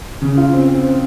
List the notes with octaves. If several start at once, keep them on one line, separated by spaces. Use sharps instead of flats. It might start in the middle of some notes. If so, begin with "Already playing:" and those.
C#3
F4
C4
C4
C4